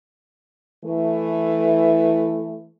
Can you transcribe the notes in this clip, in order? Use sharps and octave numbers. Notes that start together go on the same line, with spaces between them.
E3 A3